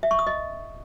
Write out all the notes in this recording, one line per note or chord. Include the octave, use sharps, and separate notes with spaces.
E5
C#6
D#6
D#5